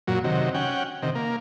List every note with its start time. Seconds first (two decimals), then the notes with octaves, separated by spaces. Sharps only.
0.08 F#2 A#2 F#3
0.24 C3 D#3 F#3
0.54 C#4 F#5 G5
1.03 C3 D#3
1.15 A#3